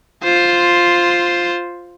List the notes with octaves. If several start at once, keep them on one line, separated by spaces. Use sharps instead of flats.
F4 C5